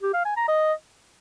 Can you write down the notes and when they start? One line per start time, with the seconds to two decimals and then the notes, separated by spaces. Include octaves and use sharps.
0.02 G4
0.14 F5
0.25 G#5
0.37 A#5
0.48 D#5